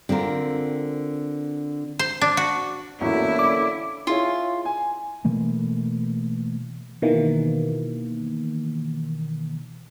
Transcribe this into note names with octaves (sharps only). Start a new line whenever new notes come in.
D3 C4 F4 A#4
C5
D4
F#4
A1 E2 D3 F#3 A#3 C#4 E4
D5 D6
E4 F4 G#4 C#5
G#5
B2 E3 A3 A#3
B2 D#3 E3 A#3